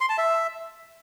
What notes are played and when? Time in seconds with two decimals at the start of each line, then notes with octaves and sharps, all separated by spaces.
0.01 C6
0.09 A5
0.18 E5